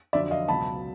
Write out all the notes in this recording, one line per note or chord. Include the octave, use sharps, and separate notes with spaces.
F2 D3 F#3 D5 E5
D#5 F5
C#2 B2 F#3 A5 B5